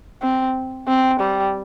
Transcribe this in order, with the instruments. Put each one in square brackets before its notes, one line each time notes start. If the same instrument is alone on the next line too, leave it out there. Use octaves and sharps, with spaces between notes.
[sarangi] C4
C4
G3